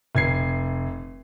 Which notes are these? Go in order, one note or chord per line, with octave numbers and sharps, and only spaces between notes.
F1 G#6 C7